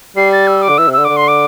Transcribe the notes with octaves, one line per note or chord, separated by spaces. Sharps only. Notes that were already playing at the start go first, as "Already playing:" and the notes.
G3 C7
A6
E6
D6
D3
E3 E6
C3
D3 E6
D3 D6
C6
D6